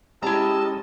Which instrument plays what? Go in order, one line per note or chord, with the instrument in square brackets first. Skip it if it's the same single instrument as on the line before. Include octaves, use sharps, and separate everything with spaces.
[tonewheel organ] G#3 C#4 D#5 [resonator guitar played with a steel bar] E4 A#5 [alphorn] G4 [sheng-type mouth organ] A5 E6